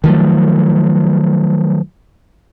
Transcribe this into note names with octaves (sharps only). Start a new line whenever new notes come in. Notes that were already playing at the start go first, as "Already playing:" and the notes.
D#3 F3 F#3 A3